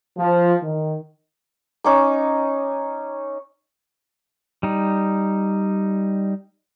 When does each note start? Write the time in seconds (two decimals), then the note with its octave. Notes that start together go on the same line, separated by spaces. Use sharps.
0.18 F3
0.62 D#3
1.84 C#4 D#4 D6
4.63 G3 D#4